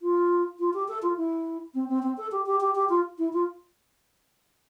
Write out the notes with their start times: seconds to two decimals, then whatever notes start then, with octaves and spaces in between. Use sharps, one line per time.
0.02 F4
0.59 F4
0.74 G4
0.88 A4
1.02 F4
1.17 E4
1.74 C4
1.89 C4
2.03 C4
2.17 A4
2.32 G4
2.46 G4
2.60 G4
2.75 G4
2.89 F4
3.18 E4
3.33 F4